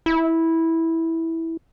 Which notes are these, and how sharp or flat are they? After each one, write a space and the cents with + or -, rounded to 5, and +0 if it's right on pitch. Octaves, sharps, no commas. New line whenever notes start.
E4 -10